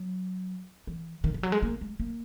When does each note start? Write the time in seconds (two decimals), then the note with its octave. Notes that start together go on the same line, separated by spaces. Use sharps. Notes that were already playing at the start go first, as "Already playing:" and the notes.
Already playing: F#3
0.87 E3
1.24 D#3
1.34 E3
1.43 F#3
1.52 G#3
1.63 A#3
1.81 G#3
2.00 A#3